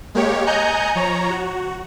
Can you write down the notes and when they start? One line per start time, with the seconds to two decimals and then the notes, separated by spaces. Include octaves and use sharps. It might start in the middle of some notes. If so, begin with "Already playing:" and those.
0.15 G#3 A#3 G4 C#5
0.46 D#5 G#5 A#5 F#6 G6 C#7
0.95 F3 C#5 A#5
1.30 F#4